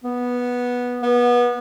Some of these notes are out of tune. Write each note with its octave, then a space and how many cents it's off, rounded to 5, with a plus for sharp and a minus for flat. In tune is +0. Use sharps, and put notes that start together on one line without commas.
B3 -10
B3 -25